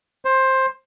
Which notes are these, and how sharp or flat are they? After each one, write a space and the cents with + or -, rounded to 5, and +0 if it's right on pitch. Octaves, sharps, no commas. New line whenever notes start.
C5 +15